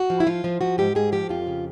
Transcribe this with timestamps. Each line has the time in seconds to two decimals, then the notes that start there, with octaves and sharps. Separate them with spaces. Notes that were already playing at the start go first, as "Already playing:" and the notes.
Already playing: F#4
0.10 F3
0.20 E4
0.27 F3 F4
0.44 F3
0.61 F3 F#4
0.78 G#2 G4
0.95 G#2 G#4
1.12 F3 G4
1.29 F2 F4
1.47 C#3